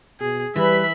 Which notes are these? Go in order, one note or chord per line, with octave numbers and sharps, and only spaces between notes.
B2 G#4
E3 G3 B4 E5 B5